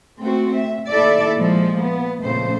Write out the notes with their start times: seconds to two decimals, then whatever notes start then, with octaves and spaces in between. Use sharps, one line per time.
0.21 A3 C4 F#4
0.55 E5
0.91 D#2 E4 A4 D5 E5
1.37 A#2 F3 G#3
1.82 B3
2.23 F2 A#2 C#3 A3 C5